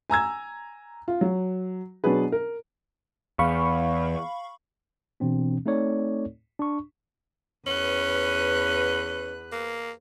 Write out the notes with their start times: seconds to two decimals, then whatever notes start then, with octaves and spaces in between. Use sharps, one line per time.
0.10 G#5 A#5 E6 G#6
1.08 F4
1.21 F#3
2.04 B2 F#3 D4 G#4 B4
2.32 A#4
3.39 E2 F5 B5 C#6
5.20 B2 E3 C4 D4
5.66 A3 C4 D#4 A4 C#5 D5
6.60 D4 C#6
7.67 E2 C#4 B4 F#6
9.52 A#3